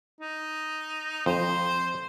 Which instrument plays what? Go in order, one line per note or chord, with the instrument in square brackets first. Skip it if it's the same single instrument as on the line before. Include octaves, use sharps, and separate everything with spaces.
[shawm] D#4
[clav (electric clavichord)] F2 [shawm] C5